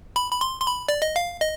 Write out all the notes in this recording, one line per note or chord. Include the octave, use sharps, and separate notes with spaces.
B5
B5
C6
C6
B5
D5
D#5
F5
D#5